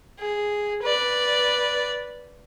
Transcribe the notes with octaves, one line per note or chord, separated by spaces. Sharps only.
G#4
B4 D5